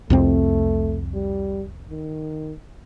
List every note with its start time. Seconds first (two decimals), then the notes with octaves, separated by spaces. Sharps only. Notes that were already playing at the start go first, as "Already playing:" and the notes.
0.10 C2 F2 A3 C4
1.14 G3
1.90 D#3